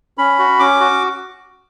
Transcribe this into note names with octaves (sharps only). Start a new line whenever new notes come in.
C#4 B5
F#4
C#4 D6
F#4